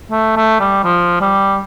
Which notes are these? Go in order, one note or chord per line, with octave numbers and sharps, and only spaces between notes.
A3
A3
G3
F3
G3